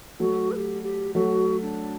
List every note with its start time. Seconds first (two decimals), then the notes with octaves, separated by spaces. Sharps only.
0.20 F#3 A3 F#4
0.51 B4
0.56 G4
0.83 G4
1.15 F#3 A3 F#4
1.62 D4